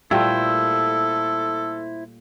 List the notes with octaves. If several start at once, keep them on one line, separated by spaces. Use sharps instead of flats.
A#2 G3 A3 E4 A4 C5